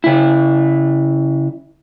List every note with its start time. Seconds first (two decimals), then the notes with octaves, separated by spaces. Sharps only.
0.04 C#3 E4